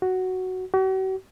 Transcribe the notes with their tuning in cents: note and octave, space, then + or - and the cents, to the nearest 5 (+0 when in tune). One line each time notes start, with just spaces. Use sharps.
F#4 +5
F#4 +45